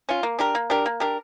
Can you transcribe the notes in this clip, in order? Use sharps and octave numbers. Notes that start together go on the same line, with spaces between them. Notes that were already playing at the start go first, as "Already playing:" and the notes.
C#4 F4
A#3
D4 G4 A#4
A#3
D4 G4 A#4
A#3
D4 G4 A#4